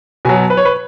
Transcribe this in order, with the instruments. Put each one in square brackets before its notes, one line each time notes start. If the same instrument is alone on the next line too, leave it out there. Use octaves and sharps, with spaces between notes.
[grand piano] B2 G#5
F#3
B4
C#5
B4